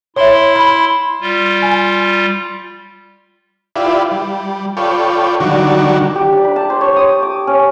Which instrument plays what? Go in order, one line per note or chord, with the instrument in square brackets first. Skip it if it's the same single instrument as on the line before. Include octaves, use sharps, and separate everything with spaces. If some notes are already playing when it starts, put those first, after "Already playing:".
[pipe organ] E4 C6 [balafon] C#5 E5
[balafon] B5
[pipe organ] G3 F4
[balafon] G#5
[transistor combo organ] E4 F4 G4 B4 D5
G3
F4 A4 B4 C#5 D5 G5
D3 D#3 F#3 G3 D4 F#4
[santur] G4
D4
B5
A5
C5
C#5
D#6
D6
C#4